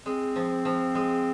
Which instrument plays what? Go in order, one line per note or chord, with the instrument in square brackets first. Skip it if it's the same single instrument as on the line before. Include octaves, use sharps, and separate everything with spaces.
[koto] G#3 [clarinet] C4
[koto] F3
F3
G#3